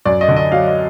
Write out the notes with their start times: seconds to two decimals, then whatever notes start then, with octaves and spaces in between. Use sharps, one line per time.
0.05 F#2 D5
0.21 D#5
0.28 D3
0.36 D#5
0.52 F#3 F5
0.67 D#5